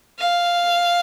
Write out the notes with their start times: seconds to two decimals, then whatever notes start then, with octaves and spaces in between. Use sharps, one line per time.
0.19 F5